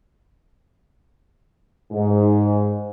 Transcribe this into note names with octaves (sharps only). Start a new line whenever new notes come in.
G#2